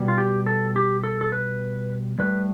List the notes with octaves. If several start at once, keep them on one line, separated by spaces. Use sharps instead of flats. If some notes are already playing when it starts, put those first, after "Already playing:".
Already playing: B2 G3
F4
G4
A4
G4
A4
A4
B4
A2 G3 B4